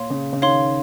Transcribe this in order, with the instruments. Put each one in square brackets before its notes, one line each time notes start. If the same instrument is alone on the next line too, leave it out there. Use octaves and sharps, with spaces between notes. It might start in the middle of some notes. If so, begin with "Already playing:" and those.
Already playing: [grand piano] A#2 [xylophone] C#5 F5 C6
[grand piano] C#3
C#3
[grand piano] D#3 [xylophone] C#5 F5 C6